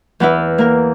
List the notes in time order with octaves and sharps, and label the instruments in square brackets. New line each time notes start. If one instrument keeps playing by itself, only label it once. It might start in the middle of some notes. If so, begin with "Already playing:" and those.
[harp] E2 B3 E4
A#3 A#4